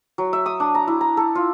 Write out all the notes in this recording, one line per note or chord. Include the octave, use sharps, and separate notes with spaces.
F#3
E5
D#6
D4
A#5
E4
A#5
A4
F4